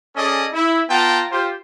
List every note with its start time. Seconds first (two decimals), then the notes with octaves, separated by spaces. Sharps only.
0.16 C#4 G#4 A4 D5 D#5
0.53 E4
0.90 B3 F4 G5 A5 A#5
1.32 F4 G4 C5